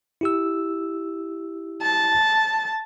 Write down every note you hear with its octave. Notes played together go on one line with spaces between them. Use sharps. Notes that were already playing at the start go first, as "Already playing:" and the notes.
E4 G4 E6
A5